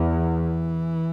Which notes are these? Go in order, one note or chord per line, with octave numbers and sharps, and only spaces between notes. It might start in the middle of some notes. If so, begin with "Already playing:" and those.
Already playing: E2
E3